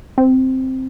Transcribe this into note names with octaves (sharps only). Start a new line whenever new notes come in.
C4